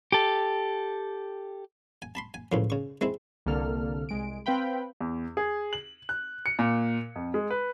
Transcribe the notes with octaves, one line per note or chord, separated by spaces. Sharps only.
G4 A4
G#5
A5 B5 C6
G#5
C#2 A2 F3
C#3 C#6
G#3 C4 E4
C2 D3 A#3 A4 F6
C2 G#3 D7
C4 B4 F5 G5 B5
E2
G#4
F#7
F#6
C#7
A#2
F2
G#3
B4